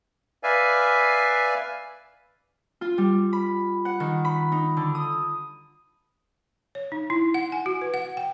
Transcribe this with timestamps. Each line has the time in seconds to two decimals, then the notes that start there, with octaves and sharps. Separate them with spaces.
0.43 B4 D5 E5 F5 G#5
2.81 F4
2.98 G3
3.33 B5
3.85 F#5
4.00 D#3
4.25 B5
4.52 D#4
4.77 D3
4.95 D#6
6.75 C#5
6.92 D#4
7.10 E4
7.34 F#5
7.52 G#5
7.66 F#4
7.82 B4
7.94 F#5
8.17 G5